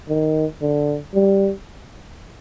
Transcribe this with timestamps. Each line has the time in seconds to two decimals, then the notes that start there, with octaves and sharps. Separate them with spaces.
0.09 D#3
0.62 D3
1.15 G3